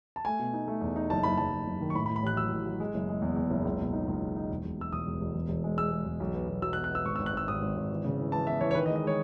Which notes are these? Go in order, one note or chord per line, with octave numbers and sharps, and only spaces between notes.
A5
A3 G#5
B2
D#4
A3
E2
D#4
F#1 A5
F#1 B5
F#1 A5
F#1
F#1
D#3
C#6
A2 B5
B5
A2
B5
A1 F#6
F#3 E6
A1
F#3
G#3
F#1
G#3
E2
E2
F#1
C#2
B2
D#4
C#2
D#4
D#4
E1
E1
E1 E6
E1 D#6
E1
E1
E1
E1
G#3
G#3 E6
G#3
E1
B1
B3
B1
F#3 E6
F#6
B3
F#6
B3 E6
G#1 C#6
E6
G#1
F#6
G#1 E6
G#1 D#6
G#1
G#1
E3
C#3
E3
E3 A5
B3 E5
E3 C#5
C#5
D#3 B4
D#5
G#3
D#5
G#3 C#5